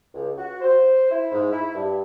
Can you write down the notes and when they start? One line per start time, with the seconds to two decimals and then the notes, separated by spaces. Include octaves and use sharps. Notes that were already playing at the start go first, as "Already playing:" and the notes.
0.13 C#2
0.37 F#4
0.61 C5
1.11 E4
1.32 G#2
1.51 E4
1.75 G2